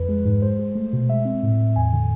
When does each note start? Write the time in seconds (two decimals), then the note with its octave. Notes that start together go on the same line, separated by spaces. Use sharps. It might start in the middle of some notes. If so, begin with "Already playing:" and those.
Already playing: F2 B4
0.09 G#3
0.25 G#2
0.42 G#3 C5
0.59 G#3
0.75 A3
0.93 B2
1.09 G#3 E5
1.25 C4
1.43 A2
1.59 A2
1.76 E2 G#5
1.93 D3